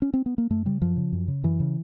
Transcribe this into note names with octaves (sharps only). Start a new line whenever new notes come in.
C#4
C4
B3
A#3
F#2 A3
C#3 G3
F#2 F3
C#3
F#2
C#3
F#2 E3
C#3